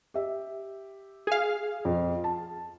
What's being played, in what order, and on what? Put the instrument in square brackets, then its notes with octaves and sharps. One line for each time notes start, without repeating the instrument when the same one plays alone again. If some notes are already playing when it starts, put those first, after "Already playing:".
[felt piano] G4 E5
[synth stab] G#4 F5
[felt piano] F2
A5